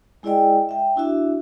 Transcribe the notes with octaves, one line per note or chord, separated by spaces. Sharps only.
G#3 E4 G#4 D5 D#5 G5
E5 G5
D4 E4 F#4 E5